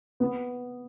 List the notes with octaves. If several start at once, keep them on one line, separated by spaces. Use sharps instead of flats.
B3